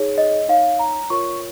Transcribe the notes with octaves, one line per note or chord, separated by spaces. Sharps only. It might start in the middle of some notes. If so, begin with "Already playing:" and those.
Already playing: D#4 G#4 C#5
D#5
D#4 C#5 F5
A#5
F4 A#4 C#5 C#6